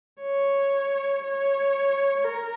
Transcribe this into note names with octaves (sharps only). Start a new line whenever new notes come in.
C#5
C#5
A#4